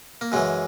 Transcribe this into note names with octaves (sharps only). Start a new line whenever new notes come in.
A#3
F#2 C#3 E3 G#3